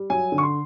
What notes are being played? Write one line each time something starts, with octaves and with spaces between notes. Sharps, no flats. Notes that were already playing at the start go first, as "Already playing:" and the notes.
Already playing: G3
F#3 G#5
D3
C#6
C6